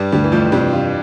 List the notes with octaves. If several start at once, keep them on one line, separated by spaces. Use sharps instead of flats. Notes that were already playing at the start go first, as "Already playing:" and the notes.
Already playing: G2 G3
D2 G2 G3
E3
F2 F3 A3
G2 C3 G3
F4